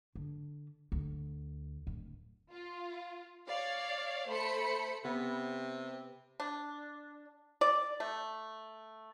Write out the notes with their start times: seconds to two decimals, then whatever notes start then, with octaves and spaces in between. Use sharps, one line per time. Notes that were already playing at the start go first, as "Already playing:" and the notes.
0.15 D3
0.92 D2
1.87 D1
2.50 F4
3.46 C#5 D5 F5
4.27 A3 C5 B5 C#7
5.05 C3 B3
6.40 D4
7.61 D5
8.00 A3